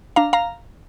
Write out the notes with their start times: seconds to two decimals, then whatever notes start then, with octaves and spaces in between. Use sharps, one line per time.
0.16 D4 F5 A#5
0.33 F5 A#5